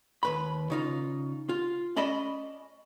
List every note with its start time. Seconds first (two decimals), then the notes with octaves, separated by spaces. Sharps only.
0.23 D#2 B4 B5
0.70 C#3 D#4 F4
1.49 F4
1.96 C#4 D5 D#5 A5 B5